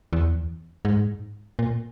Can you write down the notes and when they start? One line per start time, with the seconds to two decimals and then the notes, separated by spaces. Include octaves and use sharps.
0.13 E2
0.85 G#2
1.59 A#2